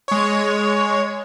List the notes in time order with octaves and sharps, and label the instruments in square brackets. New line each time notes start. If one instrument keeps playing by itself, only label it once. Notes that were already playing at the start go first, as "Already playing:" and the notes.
[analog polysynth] G#3 C#5